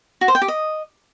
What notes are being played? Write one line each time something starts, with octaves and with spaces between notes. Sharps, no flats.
F#4
C5
G5
G4
D#5